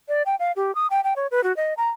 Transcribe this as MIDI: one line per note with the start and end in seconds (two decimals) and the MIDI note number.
0.08 0.22 74
0.26 0.35 79
0.39 0.52 77
0.56 0.74 67
0.75 0.87 87
0.90 1.01 79
1.04 1.14 79
1.16 1.27 73
1.31 1.43 71
1.43 1.55 66
1.57 1.74 75
1.77 1.89 82